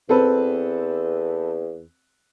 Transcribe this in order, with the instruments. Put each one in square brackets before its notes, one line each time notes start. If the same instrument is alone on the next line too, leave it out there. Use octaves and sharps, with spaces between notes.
[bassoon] E2 [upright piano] C4 A4 B4